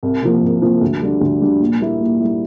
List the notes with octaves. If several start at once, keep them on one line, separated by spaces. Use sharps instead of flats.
C2
C3 F3 A#3
C2
C3 F3 A#3
D2
D3 G3 D4
D2
D3 G3 D4
A#2
G3 A#3 E4
A#2
G3 A#3 E4